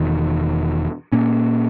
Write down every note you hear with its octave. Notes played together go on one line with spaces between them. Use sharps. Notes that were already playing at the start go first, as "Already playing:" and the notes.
Already playing: E1 E2 D#3
A#2 A#3 C#4